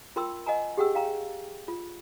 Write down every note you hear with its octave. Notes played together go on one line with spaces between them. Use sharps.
F4 A#4 G5 C6 E6
D#5 F#5 G#5 A#5
G4 G#4 F#5 G5 E6
F5 G5 A#5
F4